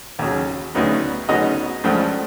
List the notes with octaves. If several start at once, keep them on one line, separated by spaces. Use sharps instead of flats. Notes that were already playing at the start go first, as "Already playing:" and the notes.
D#2 C#3 F#3
D2 C#3 F#3 B3 D#4
D2 C#3 F#3 B3 D#4 D#5
C#2 C#3 F3 A3 D4